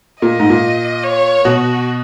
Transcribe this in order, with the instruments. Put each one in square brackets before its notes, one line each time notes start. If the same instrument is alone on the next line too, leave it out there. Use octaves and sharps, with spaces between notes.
[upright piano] A#2 [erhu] D#5
[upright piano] G#2
A#2
[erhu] C#5
[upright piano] B2 [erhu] F#4